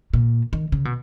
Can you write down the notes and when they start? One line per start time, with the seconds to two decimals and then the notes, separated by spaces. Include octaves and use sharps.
0.14 A#2
0.53 D#3
0.72 C#3
0.85 B2